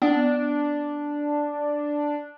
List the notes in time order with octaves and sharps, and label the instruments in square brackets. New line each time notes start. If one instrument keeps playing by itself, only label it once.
[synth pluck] B3 [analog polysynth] D4